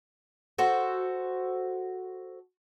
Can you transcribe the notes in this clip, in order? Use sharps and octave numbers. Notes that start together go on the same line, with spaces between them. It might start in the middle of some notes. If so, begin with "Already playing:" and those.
F#4 A4 C5